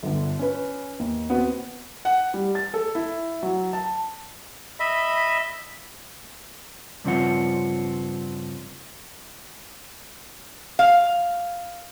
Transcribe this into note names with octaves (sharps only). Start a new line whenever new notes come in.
G1 D3
C#4 B4
D#2
B3 C4 F#4
F#5
G3
A6
A4
E4
F#3
A5
D#5 E5 B5
G2 C#3 F3 C4 F#5
F5